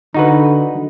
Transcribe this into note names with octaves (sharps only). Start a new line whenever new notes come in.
D3 D#4 F#4 B4